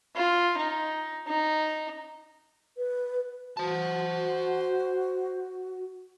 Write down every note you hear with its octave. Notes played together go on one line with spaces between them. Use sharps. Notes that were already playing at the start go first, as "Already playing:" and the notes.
F4
D#4
D#4
B4
F#4 C5 A5